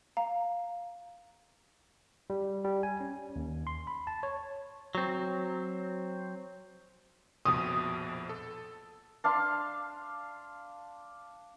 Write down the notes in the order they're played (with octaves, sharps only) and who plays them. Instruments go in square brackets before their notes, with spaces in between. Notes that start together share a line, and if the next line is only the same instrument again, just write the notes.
[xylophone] F5 A#5
[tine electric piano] G3
G3
G#5
C#4
D#2
C6
B5
A5
C#5
[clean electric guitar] F#3 C4
[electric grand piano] A#1 F2 B2 [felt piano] D#6
[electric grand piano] A4
[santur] D4 F5 A5 C6